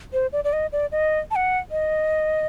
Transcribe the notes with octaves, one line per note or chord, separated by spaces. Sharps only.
C5
D5
D5
D#5
D5
D#5
A5
F#5
D#5